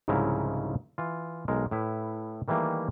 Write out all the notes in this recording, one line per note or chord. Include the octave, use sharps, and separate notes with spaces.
C2 G#2 C#3 F3 E4 A#5
E3 F4
B1 G#3 A#4
A2 E4 B4
D#3 E3 G3 A3 A#3